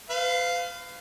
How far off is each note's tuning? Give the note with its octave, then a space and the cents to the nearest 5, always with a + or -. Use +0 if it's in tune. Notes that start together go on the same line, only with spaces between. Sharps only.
B4 +40 F5 +0